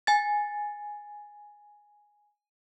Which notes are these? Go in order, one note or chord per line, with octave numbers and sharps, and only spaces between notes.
G#5 A6